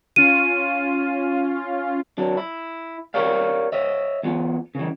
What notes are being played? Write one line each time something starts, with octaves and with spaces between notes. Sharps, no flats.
C#4 F4 D#7
F#3 D4
E4
G4 A#4 C#5 D5 F5
C#5 D#5 E5
E2 B3 F4
C#3 E3